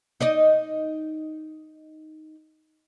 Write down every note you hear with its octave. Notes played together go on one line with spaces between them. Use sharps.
D#4 D5 D#5